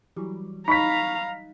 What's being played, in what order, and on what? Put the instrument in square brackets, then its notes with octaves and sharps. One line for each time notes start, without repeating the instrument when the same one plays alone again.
[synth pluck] E3 F#3 G3
[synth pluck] D#4 [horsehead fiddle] F5 A#5 [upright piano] B5 C#6 B6